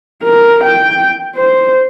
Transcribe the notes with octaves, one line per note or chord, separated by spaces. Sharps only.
A#4
G5
C5